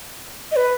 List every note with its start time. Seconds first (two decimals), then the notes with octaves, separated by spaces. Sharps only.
0.52 D#5
0.56 B4